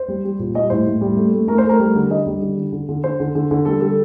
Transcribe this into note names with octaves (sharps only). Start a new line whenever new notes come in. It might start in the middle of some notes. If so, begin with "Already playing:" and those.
Already playing: C5
G3
G3
A#2
G3 D#5
A2 C5
A2
G3
A3
A3
A3 A#4
C5
A3
A#4
G3
D3
D3 D#5
G3
D3
D3
D3
D3
D3 C5
D3
D3
D3
G3 A4
G3 A4